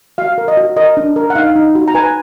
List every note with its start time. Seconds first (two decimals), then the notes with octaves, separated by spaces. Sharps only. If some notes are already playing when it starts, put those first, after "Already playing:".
0.18 F#4 F5
0.38 A#4
0.48 D#5
0.57 F#4
0.77 A#4 D#5
0.97 D4
1.16 A#4
1.30 F#5
1.35 D#4 F5
1.56 D#4
1.75 F#4
1.88 A#5
1.95 B4 G#5